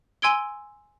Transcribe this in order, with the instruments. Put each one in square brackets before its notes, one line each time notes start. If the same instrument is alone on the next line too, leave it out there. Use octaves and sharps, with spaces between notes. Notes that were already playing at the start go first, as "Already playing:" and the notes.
[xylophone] G#5 C6 E6 G#6 D7 G7